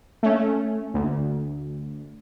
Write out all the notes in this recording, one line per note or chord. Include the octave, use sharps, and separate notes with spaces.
A3 C#4
D2